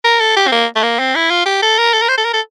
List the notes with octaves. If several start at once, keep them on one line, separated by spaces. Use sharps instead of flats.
A#4
A4
G4
C4
A#3
A3
A#3
C4
E4
F4
G4
A4
A#4
A4
A#4
C5
A4
A#4
A4